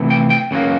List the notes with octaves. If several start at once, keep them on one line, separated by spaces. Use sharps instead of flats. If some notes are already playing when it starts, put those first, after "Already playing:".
Already playing: C3 E3 A3
G5
G5
C#2 C#3 F#3 A#3